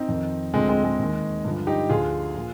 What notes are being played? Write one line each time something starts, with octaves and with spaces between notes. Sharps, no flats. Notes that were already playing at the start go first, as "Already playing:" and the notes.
Already playing: C4 D#4
F2 D#3
D2 D3 F3 G#3 C4
G#3 C4
G#3
D#2 D#3
G2 D3 F3
D#4 G4
D2 D3 F3 F4 G#4
A#2 F3